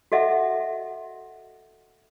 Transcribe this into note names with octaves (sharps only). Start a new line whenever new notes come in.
F#4 A4 D#5 E5 F#5